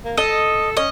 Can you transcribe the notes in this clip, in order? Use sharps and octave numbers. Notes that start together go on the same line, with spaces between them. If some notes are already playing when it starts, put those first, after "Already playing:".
A#3
A4 D#5
C#4 D#5